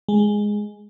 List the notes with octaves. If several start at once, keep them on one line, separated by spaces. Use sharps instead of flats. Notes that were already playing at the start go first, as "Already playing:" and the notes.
G#3